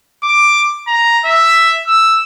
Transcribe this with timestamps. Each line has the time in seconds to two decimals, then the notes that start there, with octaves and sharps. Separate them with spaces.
0.23 D6
0.88 A#5
1.25 E5
1.88 E6